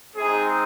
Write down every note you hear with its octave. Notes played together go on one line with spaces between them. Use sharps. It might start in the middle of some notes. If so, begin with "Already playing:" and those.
G#3 C4 D#4 G#4